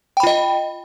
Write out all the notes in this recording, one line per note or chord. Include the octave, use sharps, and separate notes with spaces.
F4 D#5 G5 B5